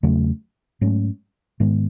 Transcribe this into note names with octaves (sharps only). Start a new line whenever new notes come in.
E2 C#3 F#3 A3
G#2 F#3 A3 C#4
G#2 D#3 G#3 B3